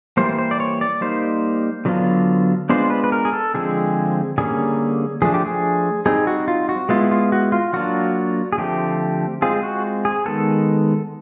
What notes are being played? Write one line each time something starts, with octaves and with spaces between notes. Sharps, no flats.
E3 G3 A#3 C5
C5
D5
C#5
D5
G3 A#3 D#4 C5
D3 F#3 B3 D4 F4
G#3 B3 D4 F4 C5
B4
B4
A#4
G#4
A4
D3 F3 G#3 C4 G#4
D3 G3 A#3 C#4 G#4
F3 A3 D4 G#4
G4
G#4
G3 C4 D#4 G#4
F#4
F4
F#4
G#3 B3 E4 F4
F4
F#4
F4
F#3 A#3 D4 F4 F#4
G#4
D3 F3 A3 C4 G4
G#3 C4 F4 G#4
F#4
G#4
D#3 G#3 B3 A4